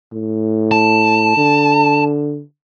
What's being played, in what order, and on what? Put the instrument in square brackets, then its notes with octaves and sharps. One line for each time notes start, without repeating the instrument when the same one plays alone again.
[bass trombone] A2
[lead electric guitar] A5
[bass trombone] D3